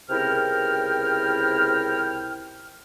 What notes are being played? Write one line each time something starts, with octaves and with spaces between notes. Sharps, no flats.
C#2 C3 E4 A#4 G5 F6